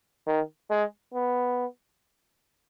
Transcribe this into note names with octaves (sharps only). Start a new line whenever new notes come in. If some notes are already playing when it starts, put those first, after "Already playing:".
D#3
G#3
B3